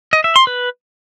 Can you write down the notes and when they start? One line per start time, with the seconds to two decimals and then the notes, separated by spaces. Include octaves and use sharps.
0.13 D#5
0.24 E5
0.36 C6
0.47 B4